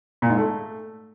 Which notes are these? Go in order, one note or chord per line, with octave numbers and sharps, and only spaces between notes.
A#2
G#2
A3